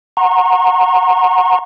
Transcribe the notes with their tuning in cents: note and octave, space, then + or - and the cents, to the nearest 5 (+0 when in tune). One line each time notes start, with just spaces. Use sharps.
F#5 -10 A#5 -5 C#6 -45